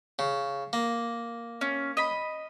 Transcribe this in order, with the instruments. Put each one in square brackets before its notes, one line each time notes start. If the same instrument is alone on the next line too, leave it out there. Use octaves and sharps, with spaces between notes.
[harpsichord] C#3
A#3
[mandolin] C#4
D#5 B5